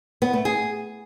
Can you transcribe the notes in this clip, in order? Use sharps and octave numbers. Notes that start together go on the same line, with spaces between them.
B3
A3
G#4